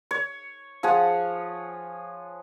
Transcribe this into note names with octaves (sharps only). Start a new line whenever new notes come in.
C#5
F3 G#4 C#5 F#5